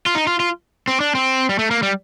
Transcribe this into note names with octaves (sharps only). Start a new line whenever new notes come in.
F4
D#4
F4
F4
C4
D4
C4
G3
A3
A#3
G3